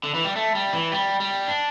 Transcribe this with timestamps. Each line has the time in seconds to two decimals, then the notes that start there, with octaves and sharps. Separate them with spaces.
0.04 D3
0.14 E3
0.24 G3
0.36 A3
0.55 G3
0.73 E3
0.92 G3
1.20 G3
1.48 D4